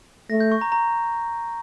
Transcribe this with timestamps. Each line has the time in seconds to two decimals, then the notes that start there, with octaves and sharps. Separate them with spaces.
0.30 A3 A#6
0.40 G6
0.52 C#6
0.61 A#5
0.72 A#5